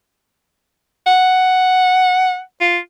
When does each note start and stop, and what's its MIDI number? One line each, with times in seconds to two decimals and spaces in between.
1.07 2.40 78
2.61 2.78 65